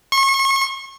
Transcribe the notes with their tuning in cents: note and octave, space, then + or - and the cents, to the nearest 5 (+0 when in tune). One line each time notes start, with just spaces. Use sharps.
C#6 -35